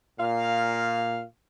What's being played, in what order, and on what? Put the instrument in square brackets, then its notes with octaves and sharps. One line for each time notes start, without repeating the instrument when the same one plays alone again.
[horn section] A#2 F5